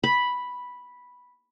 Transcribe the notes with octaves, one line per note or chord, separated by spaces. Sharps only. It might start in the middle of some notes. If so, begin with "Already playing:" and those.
B5